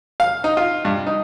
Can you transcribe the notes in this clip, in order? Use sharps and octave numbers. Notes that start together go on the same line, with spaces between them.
F5
D#4
F4
G2
D#4